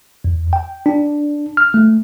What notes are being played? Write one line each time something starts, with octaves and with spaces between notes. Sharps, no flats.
E2
G5
D4
F6
A3